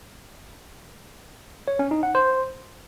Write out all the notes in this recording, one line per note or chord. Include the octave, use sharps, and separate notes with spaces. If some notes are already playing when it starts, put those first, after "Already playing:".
C#5
C#4
D#4
F#5
C5